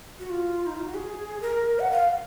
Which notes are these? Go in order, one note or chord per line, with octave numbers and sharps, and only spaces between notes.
F#4
F4
D#4
F4
F#4
G#4
A#4
F#5
F5